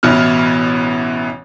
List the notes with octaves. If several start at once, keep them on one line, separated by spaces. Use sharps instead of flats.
A1 B2 E3 E4 F6